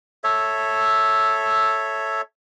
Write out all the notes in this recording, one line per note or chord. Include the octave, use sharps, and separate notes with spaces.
A4 C#5 E5